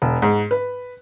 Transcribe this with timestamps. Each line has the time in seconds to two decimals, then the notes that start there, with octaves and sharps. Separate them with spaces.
0.02 E1
0.22 G#2
0.51 B4